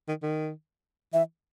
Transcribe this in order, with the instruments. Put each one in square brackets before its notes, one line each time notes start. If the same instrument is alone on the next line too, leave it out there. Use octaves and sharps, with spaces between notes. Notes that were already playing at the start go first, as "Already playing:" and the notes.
[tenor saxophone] D#3
D#3
[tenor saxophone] E3 [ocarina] E5